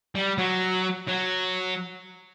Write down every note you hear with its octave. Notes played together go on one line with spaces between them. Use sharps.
G3
F#3
F#3